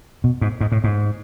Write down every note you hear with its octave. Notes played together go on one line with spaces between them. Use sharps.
B2
G#2
G#2
A2
G#2